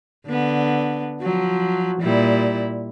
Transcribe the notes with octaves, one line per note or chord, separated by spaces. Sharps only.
D3 B3
F3 F#3
A#2 G3 E4